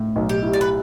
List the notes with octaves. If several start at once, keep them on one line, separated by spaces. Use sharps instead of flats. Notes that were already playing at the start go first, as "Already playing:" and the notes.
Already playing: A2 A3
B1
G4
E4
D5
B4